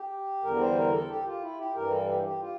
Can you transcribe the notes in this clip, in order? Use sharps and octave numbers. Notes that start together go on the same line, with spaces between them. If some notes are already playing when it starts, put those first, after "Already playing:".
Already playing: G4
E2 D3 G3 A#4
C5
A#4
A4
G4
F4
E4
G4
G2 E3 G3 A#4
A4
G4
G4
F4